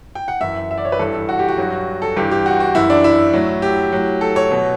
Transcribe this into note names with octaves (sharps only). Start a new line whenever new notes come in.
G5
F#5
F#2 E3 E5
E5
D5
C#5
B4
G2 E3 A4
E4
F#4
G4
F#4
G2 F#3
A4
G2 E3 G4
G4
F#4
F#4
F#2 E3 E4
D4
E4
A2 F#3
G4
A2 F#3
A4
C#5
B2 F#3